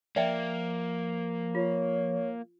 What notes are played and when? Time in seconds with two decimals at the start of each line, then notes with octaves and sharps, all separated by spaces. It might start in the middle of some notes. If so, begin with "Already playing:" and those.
0.16 F3 A#3 D5 E5 G5
1.55 F4 C#5